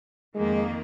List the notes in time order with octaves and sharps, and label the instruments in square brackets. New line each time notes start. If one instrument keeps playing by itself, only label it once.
[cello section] F2 D#3 A#3 [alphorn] G#3